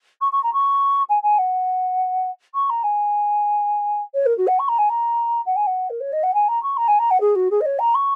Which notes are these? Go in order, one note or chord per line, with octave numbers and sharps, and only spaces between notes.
C#6
C#6
A#5
C#6
G#5
G#5
F#5
C#6
A#5
G#5
C#5
A#4
F#4
F#5
C#6
A#5
G#5
A#5
F#5
G#5
F#5
A#4
C#5
D#5
F#5
G#5
A#5
C#6
A#5
G#5
A#5
F#5
G#4
F#4
G#4
D#5
C#5
A#5
C#6